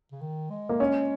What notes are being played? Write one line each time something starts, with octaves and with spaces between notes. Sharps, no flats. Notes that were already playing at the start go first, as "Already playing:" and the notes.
C#3
D#3
G#3
A#3
C#4